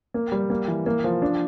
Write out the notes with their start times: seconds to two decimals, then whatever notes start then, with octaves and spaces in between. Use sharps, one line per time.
0.14 A#3
0.32 G3
0.50 A#3
0.68 E3
0.86 A#3
1.04 F3
1.22 D4